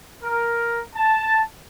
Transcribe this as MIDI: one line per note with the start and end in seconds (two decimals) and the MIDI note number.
0.23 0.79 70
0.95 1.41 81